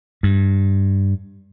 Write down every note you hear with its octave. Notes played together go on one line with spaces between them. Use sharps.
G2